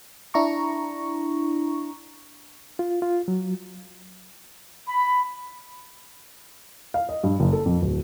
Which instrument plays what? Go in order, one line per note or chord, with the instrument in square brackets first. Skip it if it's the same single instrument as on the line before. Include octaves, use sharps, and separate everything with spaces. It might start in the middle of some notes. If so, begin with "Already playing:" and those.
[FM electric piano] D4 E4 A#5 C#6
[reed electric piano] F4
F4
F#3
[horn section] B5
[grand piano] F5
D#5
G2
F#1
A4
F2
D1